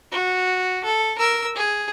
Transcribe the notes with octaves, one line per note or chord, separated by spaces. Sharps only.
F#4
A4
A#4 E6
G#4